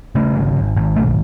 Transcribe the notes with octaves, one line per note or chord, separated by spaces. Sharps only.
C#3 A3
G#1
G#1
G#1
B1 A3